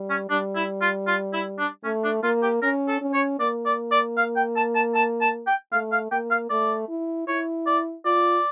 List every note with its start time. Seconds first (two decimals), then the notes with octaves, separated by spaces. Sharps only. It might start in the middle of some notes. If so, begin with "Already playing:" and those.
Already playing: G3
0.10 C#4
0.29 G3 D4
0.56 E4
0.81 F4
1.07 F4
1.33 E4
1.59 D4
1.84 A3 C#4
2.04 D4
2.23 A#3 F4
2.43 G4
2.62 C#4 A#4
2.88 A4
3.01 C#4
3.14 C#5
3.39 A#3 D5
3.66 D5
3.91 D5
4.17 F5
4.36 G5
4.56 A5
4.75 A5
4.95 A5
5.21 A5
5.47 G5
5.73 A3 F5
5.92 F5
6.11 A#3 G5
6.31 F5
6.50 A3 D5
6.89 E4
7.27 E4 C#5
7.66 D5
8.05 F4 D5